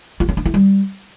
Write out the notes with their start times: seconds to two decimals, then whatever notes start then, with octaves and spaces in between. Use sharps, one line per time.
0.20 F4
0.29 C#4
0.37 D4
0.45 E4
0.54 G3